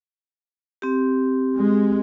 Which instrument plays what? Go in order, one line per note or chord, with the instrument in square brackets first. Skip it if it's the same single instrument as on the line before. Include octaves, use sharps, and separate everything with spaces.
[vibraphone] C4 G4
[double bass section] G#3